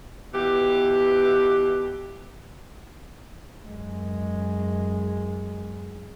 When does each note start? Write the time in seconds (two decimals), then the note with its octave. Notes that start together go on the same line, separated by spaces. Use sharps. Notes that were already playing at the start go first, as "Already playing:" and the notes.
0.34 B2 E3 G4
3.63 F#2 G#3